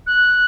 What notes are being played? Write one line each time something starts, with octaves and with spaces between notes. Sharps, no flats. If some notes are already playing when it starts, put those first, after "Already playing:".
F#6